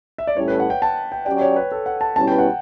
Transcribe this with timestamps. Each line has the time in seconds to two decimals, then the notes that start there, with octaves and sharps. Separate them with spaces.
0.18 E5
0.27 D5
0.37 A2 G3 C#4 E4 A4 C#5
0.48 B4
0.60 F#5
0.70 G5
0.82 A5
1.12 G5
1.26 F#3 C#4 G4 D5 G5
1.41 C#5
1.56 B4
1.72 A4
1.86 F#5
2.01 A5
2.16 B2 G3 C#4 E4 B4 A5
2.28 G5
2.39 F#5